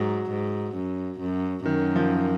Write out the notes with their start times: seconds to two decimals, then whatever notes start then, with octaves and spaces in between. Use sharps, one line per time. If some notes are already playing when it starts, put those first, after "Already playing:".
Already playing: G#2 F#3
0.30 G#2
0.76 F#2
1.20 F#2
1.66 F#2 D#3
1.96 F3